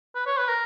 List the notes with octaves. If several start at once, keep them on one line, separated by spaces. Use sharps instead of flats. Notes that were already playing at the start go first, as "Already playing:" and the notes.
B4
C#5
B4
A#4